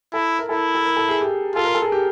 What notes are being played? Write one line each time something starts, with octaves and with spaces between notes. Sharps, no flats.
E4 A4
A#4
E4 A4
A4
A#4
A4
G#4
G4
F4 A4
A#4
A4
G#4
G4